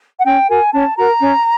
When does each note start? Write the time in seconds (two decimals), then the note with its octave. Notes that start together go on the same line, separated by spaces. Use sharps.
0.19 F#5
0.25 C#4 G5
0.49 F#4 A#4 G#5
0.73 C#4 A5
0.97 F#4 A#4 A#5
1.20 C#4